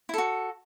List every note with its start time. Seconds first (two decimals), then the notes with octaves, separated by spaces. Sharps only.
0.09 E4
0.14 A4
0.18 F#4